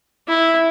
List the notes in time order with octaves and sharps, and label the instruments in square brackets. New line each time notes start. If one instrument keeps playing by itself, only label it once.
[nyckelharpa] E4